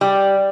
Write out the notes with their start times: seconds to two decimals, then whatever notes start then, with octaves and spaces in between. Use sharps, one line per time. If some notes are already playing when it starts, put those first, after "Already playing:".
0.01 G3